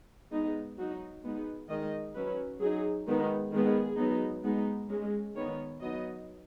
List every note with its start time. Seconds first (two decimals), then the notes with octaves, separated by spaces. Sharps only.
0.32 G#3 B3 D#4
0.78 F#3 D#4 F#4
1.24 G#3 B3 D#4
1.69 D#3 G#3 D#4 D#5
2.15 F#3 C#4 B4
2.60 F#3 D#4 G#4
3.07 D#3 G#3 B3 D#4
3.52 D#3 G#3 B3 G#4
3.98 F#3 B3 D#4
4.44 G#3 B3 D#4
4.89 G#3 C#4
5.35 D#3 B3 D#4 C#5
5.81 F#3 B3 D#4 D#5